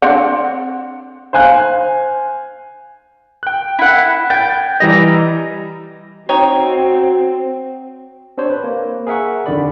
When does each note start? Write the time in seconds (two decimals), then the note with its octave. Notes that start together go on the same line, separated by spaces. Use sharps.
0.02 C4 D4 F#5
1.33 C5 F5 G#5 F#6
3.43 G5 F#6
3.79 E4 F#5
4.30 G5 G#6 A6
4.80 E3 G3 D#5 A#5
6.29 C4 D#4 F#4 C#5 G5
8.38 C4 D4 G4 C5 C#5
8.50 B4
8.64 A#3
9.07 G#4 A#4 E5 F#5 C#6
9.46 F2 D3 D#3 G4 D5 B5